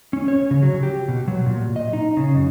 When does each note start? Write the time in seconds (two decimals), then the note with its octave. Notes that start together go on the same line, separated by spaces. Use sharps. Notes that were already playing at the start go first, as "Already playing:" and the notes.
0.13 C#4
0.28 C#5
0.51 C#3
0.63 F#3
0.83 G4
1.08 B2
1.28 F#3
1.46 A#2
1.76 D#5
1.93 D#4
2.17 C#3
2.35 F#2